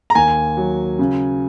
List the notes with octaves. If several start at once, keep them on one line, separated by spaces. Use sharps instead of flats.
A#5
D#2 G#5
F#3
C#3